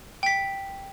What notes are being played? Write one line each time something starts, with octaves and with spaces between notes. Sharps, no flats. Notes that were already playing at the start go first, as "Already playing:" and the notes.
G5 B6